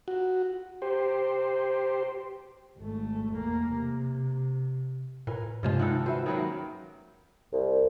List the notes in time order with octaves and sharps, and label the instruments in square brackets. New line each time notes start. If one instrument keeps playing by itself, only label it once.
[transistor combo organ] F#4
G4 C5
[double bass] G#1 A3
E2 A#3
C3
[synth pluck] A2 [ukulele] A#4 B4 G#5
[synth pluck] G2 C3 G#3 [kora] F3 F4 [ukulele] C#4
[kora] G#2 D#3 A4 [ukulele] E4 F#5
[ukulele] F#4 B4 E5 [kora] C5
[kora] D#3 F#3 A#3 [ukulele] C#4 B4
[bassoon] C2